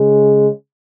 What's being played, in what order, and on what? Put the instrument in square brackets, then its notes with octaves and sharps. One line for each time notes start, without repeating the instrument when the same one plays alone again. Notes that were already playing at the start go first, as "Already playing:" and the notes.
Already playing: [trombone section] C#3 G#3